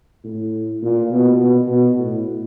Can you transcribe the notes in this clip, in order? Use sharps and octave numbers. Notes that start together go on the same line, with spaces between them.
A2
A#2
B2
B2
B2
A2